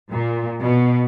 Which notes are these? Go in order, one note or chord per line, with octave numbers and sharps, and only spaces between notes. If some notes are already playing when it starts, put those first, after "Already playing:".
A#2
B2